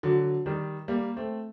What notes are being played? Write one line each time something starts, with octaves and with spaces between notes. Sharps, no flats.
D3 F#3
D#3 G3
G3 A#3
A3 C4